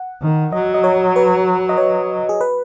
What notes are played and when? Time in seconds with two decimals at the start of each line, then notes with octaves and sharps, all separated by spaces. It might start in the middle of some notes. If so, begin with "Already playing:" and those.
Already playing: F#5
0.22 D#3
0.52 F#3 D#5
0.74 D#5
0.84 C#5
1.16 B4
1.69 D#5
1.78 C#5
2.29 G#4
2.41 B4